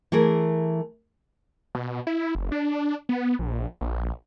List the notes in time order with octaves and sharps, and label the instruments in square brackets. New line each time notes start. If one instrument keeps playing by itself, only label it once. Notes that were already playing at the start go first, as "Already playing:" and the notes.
[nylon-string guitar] E3 A3 G#4 A#4
[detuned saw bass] B2
E4
F#1
D4
B3
A#1
A#1